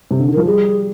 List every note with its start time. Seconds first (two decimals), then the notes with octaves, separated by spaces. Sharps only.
0.11 C3
0.19 D3
0.28 D#3
0.34 F3 A#4
0.45 G3 G#4